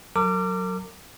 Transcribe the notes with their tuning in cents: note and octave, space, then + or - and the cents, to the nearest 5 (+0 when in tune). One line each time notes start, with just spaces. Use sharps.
F#3 +0 A#4 -40 D6 +0